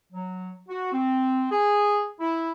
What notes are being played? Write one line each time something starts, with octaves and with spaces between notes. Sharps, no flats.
F#3
F#4
C4
G#4
E4